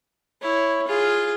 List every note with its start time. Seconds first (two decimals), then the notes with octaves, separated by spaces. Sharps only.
0.42 E4 C#5
0.87 F4 G#4